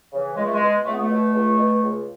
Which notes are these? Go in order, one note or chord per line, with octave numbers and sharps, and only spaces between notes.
C#3 E3
C#2 G#3
A3
G#3
B2
C#2 A3
B3
A3
B2
C#2
B2
C#2